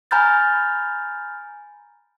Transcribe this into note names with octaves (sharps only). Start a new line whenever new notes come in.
G#5 A#5 B5 F6 G6 A6